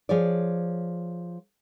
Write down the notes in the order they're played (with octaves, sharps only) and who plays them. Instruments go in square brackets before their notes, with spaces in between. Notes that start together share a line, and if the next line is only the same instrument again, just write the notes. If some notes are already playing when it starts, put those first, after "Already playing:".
[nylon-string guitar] F3 G#4 C#5 D5